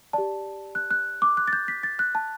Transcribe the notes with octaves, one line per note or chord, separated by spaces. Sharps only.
G4 D5 A5
F#6
F#6
D6
F#6
A6
G6
B6
A6
F#6
A5